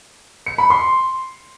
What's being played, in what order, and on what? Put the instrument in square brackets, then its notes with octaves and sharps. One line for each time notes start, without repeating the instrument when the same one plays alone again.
[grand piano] C#7
B5
C6